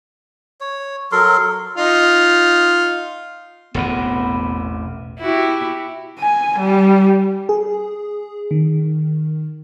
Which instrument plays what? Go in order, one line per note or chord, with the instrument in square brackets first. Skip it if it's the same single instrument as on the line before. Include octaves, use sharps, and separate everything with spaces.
[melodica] C#5
F#3 A4 A#4 C6
[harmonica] D#4 F4
[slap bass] E1 A1 C3 [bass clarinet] B3
[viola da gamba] E4 F#4 G4
[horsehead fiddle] G#5
G3
[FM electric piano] G#4
D#3